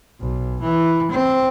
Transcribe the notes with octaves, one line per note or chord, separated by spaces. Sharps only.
B1
E3
C4